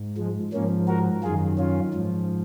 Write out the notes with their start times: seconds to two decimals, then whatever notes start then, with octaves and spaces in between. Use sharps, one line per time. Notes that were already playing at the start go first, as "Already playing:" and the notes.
Already playing: G#2
0.17 F3 G#3
0.53 G#2 F3 A#3 C#4
0.88 F#4 A#4
1.23 F#2 D#3 F4 G#4
1.58 C#4 F4
1.94 G#2 F3